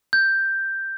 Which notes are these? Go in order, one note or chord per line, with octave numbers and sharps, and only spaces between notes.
G6